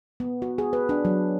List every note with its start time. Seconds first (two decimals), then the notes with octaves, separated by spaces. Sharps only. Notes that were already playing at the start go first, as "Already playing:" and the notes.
0.20 B3
0.42 F#4
0.58 G#4
0.73 B4
0.89 D4
1.05 F#3